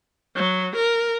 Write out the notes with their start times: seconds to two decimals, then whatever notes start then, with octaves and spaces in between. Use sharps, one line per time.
0.36 F#3
0.75 A#4